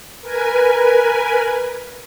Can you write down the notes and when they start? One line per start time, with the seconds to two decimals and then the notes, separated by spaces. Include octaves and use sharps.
0.21 A#4 B4 G#5